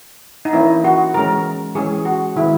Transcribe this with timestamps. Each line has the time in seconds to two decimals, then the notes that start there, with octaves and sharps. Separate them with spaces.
0.45 D#4
0.53 E3 A#3 C#4 E4
0.84 F#4
1.14 E3 G#3 C#4 A#4
1.75 E3 G#3 C#4 G#4
2.05 F#4
2.36 D#3 G#3 B3 E4